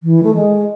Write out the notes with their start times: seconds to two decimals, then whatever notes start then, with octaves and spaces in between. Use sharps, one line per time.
0.03 E3
0.23 A3
0.34 G#3